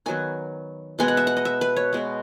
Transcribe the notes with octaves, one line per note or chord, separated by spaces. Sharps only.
D#3 F#3 B3 G#5
B2 G#3 B3 G#5
F#5
E5
F#5
D#5
E5
B4
C#5
B2 G#3 B3